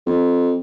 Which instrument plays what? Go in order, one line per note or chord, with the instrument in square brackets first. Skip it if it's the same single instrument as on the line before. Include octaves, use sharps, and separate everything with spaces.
[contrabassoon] F2